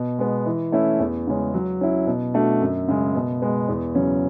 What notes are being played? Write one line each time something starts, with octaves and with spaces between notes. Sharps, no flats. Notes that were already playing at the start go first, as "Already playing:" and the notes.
Already playing: B2
G#3 B3
E3
A3 C#4 E4
E2
C#3 G#3 C#4
F#3
C#4 E4
B2
A3 D4 F#4
F#2
C#3 G#3
B2
G#3 B3
E2
C#3 F#3 C#4